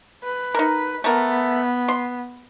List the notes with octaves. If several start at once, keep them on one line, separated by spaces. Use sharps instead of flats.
B4
D#4 A#4
A3 B3 A#4
C6